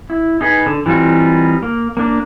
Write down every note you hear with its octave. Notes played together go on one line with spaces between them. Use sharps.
E4
D#4 G#4 B4
D3
E3 G3 C4 D#4 F4
A#3
A#3 D4